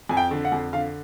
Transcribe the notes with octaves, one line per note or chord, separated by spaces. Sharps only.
F2 G#5
G5
D3
F#5
F2
D3 F5